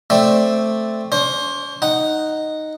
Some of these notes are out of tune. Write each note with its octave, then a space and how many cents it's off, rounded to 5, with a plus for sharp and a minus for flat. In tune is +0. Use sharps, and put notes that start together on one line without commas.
A3 +0 C4 +0 D5 +0
D4 -45 C5 +25
D#4 +0 F#5 +0